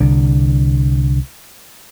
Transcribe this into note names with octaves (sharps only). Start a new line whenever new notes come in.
C2 D3